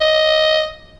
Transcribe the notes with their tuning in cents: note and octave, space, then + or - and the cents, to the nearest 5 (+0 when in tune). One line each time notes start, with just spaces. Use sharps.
D#5 +5